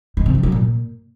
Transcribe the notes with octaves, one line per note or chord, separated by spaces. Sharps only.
D#3
C3
F3
F#3
A#2